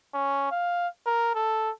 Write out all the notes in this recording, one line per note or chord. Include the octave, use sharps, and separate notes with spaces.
C#4
F5
A#4
A4